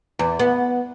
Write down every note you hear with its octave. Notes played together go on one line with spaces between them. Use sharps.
E2
B3